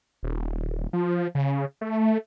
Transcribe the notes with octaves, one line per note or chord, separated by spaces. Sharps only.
D#1
F3
C#3
A3